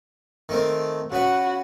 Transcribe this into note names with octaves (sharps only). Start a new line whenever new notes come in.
D#3 A3 C4
C#3 F#4 B4